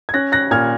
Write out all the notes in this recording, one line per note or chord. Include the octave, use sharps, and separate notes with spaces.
G#6
C#4 F#6 A#6
F#6 A#6
A#2 F6 G#6